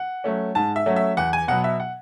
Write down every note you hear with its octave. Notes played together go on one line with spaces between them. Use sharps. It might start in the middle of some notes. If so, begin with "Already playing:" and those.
Already playing: F#5
F#3 A3 C#4
G#2 A5
E5
F#3 A3 C#4
E5
E2 F#5
G#5
B2 F#3 B3 F#5
E5
F#5